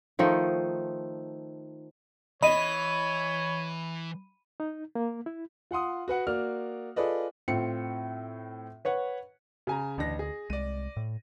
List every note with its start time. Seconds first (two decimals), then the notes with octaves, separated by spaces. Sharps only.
0.19 D#3 F3 A3 D#4
2.42 E3 C#5 D#5 B5 D#7
4.60 D#4
4.95 A#3
5.26 E4
5.71 F4 F#5 C6 D#6
6.08 F#4 B4 F#5
6.27 A#3 F#4 D5 F6
6.96 F4 G#4 A4 B4 D5 D#5
7.48 A2 C4 F4 C#7
8.85 B4 C#5 F#5
9.67 C#3 G#5 A#5
9.98 A1 D2 D4 A#6
10.19 G#4
10.50 C2 G#3 D5 D#7
10.97 A2